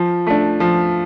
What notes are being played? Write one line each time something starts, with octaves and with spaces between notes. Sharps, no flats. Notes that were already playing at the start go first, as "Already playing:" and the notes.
Already playing: F3
A3 D4
F3